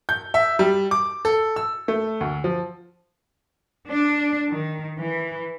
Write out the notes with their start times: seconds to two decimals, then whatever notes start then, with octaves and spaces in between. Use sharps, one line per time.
0.09 G6
0.34 E5
0.59 G3
0.91 D6
1.25 A4
1.56 E6
1.88 A3
2.21 D2
2.44 F3
3.88 D4
4.50 D#3
4.98 E3